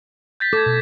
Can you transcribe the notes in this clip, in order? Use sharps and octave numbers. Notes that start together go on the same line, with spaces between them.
G6 A6 B6
A4 D6 G#6
B2